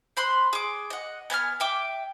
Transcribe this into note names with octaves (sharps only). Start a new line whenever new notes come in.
C5 B5 C6 F#6
G#4 D6
D#5 F#5
B3 G#5 A5 F6
E5 G5 D6